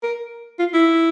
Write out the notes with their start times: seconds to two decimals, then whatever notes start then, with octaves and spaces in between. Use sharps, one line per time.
0.03 A#4
0.59 F4
0.74 E4